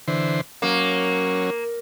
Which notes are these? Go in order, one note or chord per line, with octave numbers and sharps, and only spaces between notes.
D3 E3 C5
F#3 A#3 C#4